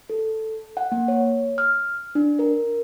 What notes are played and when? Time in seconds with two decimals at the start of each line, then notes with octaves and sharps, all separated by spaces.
0.10 A4
0.77 F#5
0.92 A#3
1.08 C#5
1.58 F6
2.15 D4
2.39 A#4